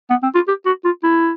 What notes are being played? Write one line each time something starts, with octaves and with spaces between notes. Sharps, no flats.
B3
C4
F4
G4
F#4
F4
E4